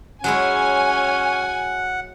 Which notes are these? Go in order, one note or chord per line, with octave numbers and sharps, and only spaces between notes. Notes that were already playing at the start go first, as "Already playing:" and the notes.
F#3 G#3 C#4 E4 F#5 G#5